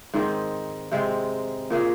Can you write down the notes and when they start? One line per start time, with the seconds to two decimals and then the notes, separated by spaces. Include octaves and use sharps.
0.14 G#2 D#3 C4 D#4
0.92 C3 G#3 C4
1.70 A#2 A#3 F4 G#4